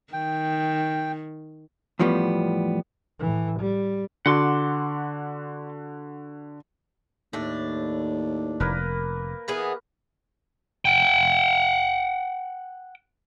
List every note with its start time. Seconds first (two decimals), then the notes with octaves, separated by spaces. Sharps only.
0.13 D#3 G5
1.99 E2 A2 F3 G3 B3
3.20 A2 E3
3.60 G3
4.26 D3 F#4 F#5 C6 D6
7.33 D#2 A2 D4
8.60 F1 A#3 A#4 B4
9.48 E3 B3 G#4
10.85 F#5 G5